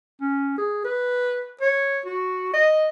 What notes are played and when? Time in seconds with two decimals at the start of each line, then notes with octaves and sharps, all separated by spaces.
0.21 C#4
0.58 G#4
0.84 B4
1.61 C#5
2.06 F#4
2.53 D#5